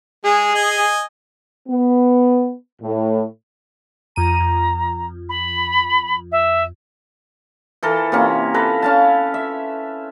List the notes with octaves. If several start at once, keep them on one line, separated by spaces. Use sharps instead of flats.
G#3 G#4
D#5 G#5
B3
A2
F2 A#5 D#7
F2
B5
E5
E3 A4 A#4
C3 A#3 C#4
A4 B4 A#5
C#4 F5 A5
E5